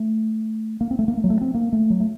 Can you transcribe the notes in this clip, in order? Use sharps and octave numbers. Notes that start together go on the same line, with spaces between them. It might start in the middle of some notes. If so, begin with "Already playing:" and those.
Already playing: A3
A#3
C4
A3
A#3
A3
F#3
A3
C4
A#3
A3
F#3
A3